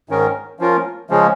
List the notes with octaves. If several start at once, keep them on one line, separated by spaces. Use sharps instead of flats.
G#2 D#3 C#4 A#4
F3 C#4 F4 A#4
C#3 F3 G#3 C#4